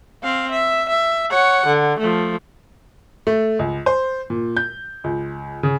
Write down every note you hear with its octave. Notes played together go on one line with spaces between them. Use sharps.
C4 F5
E5
E5
C#5 F#5
D3
F3 A3
A3
C#2
C5
A#2
G6
C#2
C#3